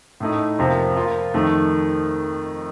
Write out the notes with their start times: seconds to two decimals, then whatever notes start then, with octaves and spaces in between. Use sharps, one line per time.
0.20 A2 A3 D#4
0.59 F2 C3 F3 A#3
0.95 F3 A#3 F4
1.34 F2 D#3 A3